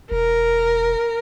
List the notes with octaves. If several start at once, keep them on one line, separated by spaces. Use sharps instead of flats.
E1 A#4